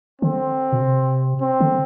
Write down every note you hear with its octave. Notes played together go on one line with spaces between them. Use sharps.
D3 C4
B2
C3
C4
D3